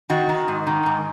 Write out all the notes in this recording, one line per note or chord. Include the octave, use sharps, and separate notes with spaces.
D#3 F#4
D#3
G#2
D#3
G#2